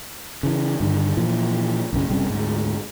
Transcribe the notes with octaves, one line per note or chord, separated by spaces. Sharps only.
C#3 E3
G2 D3 D#3
A#2 E3 F3
B1 F#2 C#3
F#1 C3 G3 C#4
D2 G#2